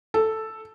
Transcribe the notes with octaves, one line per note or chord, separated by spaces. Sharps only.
A4